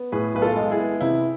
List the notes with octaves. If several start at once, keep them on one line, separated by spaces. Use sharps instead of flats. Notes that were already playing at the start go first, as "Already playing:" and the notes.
Already playing: B3
A2 G#4 B4
B1 B4
F4 A4
G#3
E4 G#4
B3
C3 E4